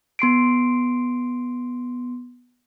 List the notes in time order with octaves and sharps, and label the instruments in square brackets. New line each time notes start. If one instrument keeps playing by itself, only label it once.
[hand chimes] B3 C6 C7 D7